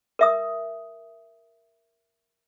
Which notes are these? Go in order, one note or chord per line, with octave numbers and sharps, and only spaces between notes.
A#4 E5 D#6